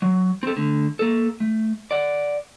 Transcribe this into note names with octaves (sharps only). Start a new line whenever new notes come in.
F#3
C4 A4
D3 A3
A#3 A4
A3
D5 F#5